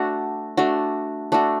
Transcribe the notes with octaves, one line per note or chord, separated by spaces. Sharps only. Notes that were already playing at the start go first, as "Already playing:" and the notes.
Already playing: A3 D4 F#4
A3 D4 F#4
A3 D4 F#4